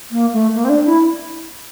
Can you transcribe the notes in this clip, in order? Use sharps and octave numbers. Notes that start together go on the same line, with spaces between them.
A#3
A3
A#3
C4
D4
E4